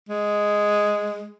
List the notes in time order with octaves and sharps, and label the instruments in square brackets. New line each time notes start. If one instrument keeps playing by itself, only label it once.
[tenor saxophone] G#3